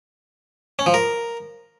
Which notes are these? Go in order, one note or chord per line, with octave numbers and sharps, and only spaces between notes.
C#4
F3
A#4